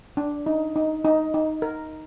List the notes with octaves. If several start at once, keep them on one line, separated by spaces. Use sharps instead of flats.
D4
D#4
D#4
D#4
D#4
A#4